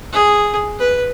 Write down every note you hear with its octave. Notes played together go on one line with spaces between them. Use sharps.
G#4
B4